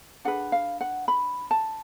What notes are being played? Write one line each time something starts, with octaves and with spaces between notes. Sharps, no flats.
D4 G#4 B4 F#5
F5
F#5
B5
A5